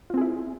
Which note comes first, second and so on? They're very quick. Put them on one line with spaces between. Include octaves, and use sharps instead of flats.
F4 C4 G#4 E4